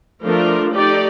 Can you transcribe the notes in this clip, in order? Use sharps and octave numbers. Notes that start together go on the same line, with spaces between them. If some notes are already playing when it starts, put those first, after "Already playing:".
F3 A3 D4 F4 A#4
A3 D#4 G4 D5